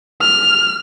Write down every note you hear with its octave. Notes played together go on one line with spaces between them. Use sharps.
F6